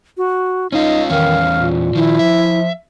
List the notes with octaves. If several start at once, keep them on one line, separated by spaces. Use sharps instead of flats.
F#4
C#4 D#4 F4 D#5
E2 D#3 C#4 F5
A#2
D#3 F3 E4
F3 E5